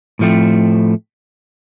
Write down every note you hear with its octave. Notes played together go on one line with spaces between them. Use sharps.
A2 F3 A3 C4